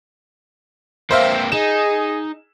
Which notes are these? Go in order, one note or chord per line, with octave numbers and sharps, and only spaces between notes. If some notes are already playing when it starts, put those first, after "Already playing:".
A#3 C4 C5 E5 F5
D#4 G#4 E7